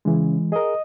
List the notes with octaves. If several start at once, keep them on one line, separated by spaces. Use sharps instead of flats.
C#3 E3 G#3
G#4 A#4 D#5